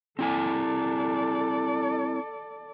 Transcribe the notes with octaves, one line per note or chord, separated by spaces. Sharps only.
C4 E4 A4 D5 G#5